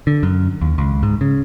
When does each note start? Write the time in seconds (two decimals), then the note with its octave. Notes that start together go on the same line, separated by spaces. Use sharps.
0.07 D3
0.23 F#2
0.62 D#2
0.78 C#2
1.03 G#2
1.21 C#3